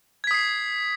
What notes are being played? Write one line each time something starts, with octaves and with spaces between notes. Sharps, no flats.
D#6 G#6 B6 C7